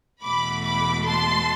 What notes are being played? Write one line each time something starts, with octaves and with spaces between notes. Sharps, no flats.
E2 B2 A3 B5 D6
B5 D6
A5 C6